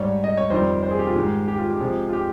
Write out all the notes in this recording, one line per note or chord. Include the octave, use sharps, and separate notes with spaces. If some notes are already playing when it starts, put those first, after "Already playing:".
Already playing: G#2 G3 C#5
D#5
C#5
F2 D#3 G3 C5
C5
G#4
G4
F4
G#2 D#3 G#3 G4
G4
F4
G4
C3 F3 G#3
F4
G4